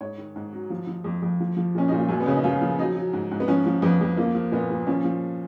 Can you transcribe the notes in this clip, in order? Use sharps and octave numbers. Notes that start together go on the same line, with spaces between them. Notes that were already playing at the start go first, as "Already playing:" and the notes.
G#2 C#5
D#3
G#2
F#3
F3
F3
F2
F2
F3
F3
A#2 C#4
A#2 D#4
F4
F#2 F#4
B3
C#3 C#4
D#4
F#2 F4
F3
F#3 D#4
F#3
G#2
G#2
B3
F3 C#4
F3
F2 B3
F2
F3 A#3
F3
A#2 B3
A#2
F3 C#4
F3